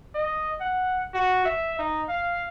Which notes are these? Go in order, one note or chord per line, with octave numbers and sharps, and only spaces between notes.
D#5
F#5
F#4
E5
D#4
F5